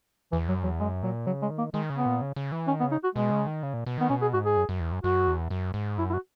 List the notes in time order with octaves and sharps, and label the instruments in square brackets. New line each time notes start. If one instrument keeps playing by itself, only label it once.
[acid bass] E2 [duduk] E3
[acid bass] F#2 [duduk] F#3
[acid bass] E2 [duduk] F#3
[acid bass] F#2 [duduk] G#3
[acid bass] A#2 [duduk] F#3
[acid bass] C#3 [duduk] F#3
[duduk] G#3
[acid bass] D#3
[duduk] A#3
[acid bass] D#3 [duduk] G#3
[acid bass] C#3
[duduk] B3
[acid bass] A#2
C#3
C#3
E3
[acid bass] D#3 [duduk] C#4
[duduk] B3
[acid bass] C#3
[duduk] D#4
F#4
[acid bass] B2 [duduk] G#3
[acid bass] C#3
D#3
C#3
A#2
B2
[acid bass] D#3 [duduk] B3
[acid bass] B2 [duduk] C#4
[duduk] G#4
[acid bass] G#2 [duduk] F#4
[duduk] G#4
[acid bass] F#2
F#2
E2
F#2
[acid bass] F#2 [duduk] F#4
[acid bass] E2
F#2
G#2
[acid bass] F#2 [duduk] E4
[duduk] E4
F#4